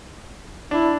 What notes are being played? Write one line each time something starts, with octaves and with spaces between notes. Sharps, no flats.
D4 E4